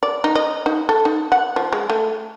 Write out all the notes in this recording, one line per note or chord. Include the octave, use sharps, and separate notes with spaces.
D5
D#4
D#5
D#4
A4
D#4
F#5
F3
G#3
A3